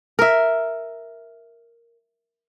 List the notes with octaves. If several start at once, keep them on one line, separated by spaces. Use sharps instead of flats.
A#4 E5